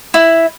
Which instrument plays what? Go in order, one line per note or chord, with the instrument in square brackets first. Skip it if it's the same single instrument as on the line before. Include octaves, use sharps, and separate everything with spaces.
[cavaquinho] E4